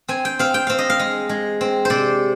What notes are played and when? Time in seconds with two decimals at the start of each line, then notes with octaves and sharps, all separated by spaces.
0.08 C4 G#5
0.25 G5
0.39 C4 F5
0.54 G5
0.67 C4 F5
0.78 D#5
0.90 F5
0.99 G#3
1.29 G#3
1.61 C4
1.85 C3 C5 D5